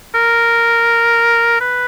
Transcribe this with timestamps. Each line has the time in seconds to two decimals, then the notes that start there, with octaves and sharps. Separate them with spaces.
0.14 A#4
1.61 B4